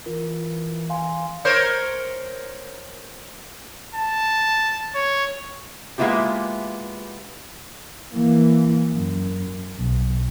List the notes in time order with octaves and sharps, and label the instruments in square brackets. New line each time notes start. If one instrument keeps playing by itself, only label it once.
[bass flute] E3 [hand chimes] F4 A#4
[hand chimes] F5 G#5 C6
[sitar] A#4 C5 C#5
[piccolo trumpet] A5
C#5
[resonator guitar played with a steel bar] G#3 A#3 B3 E4 F4 G4
[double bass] E3 A#3
F#2
B1